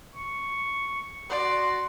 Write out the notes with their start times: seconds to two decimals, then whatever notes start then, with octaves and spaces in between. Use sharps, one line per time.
0.16 C#6
1.30 F#4 D5 C6